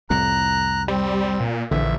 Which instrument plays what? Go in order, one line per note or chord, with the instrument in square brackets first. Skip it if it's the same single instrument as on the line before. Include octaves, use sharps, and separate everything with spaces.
[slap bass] C2 F2 A2 [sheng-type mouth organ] A#5 F#6
[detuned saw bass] G3 [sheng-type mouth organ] C4
[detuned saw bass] A#2
[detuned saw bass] A#1 [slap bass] D3 E3 [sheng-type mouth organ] E5